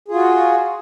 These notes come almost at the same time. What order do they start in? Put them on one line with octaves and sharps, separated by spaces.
G#4 F4 F#4